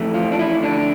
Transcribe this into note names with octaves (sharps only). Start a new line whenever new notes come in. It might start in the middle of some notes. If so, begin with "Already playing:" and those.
Already playing: F2 E3 A3
F3 F4
D4
E3 E4
D3 D4